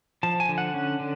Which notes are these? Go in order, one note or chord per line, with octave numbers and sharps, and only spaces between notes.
F3 A5
G#5
D3
F#5
C#4
D3